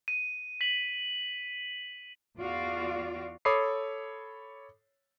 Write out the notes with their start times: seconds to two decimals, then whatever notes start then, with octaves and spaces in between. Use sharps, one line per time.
0.08 D#7
0.61 B6 F#7
2.37 E2 F4 F#4 D5 F5
3.45 A4 C#5 B5 D6 D#6 C7